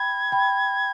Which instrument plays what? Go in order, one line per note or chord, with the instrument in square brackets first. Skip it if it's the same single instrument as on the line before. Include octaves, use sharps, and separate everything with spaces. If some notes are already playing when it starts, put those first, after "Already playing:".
Already playing: [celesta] G5 B5 [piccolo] G#6
[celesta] G5 B5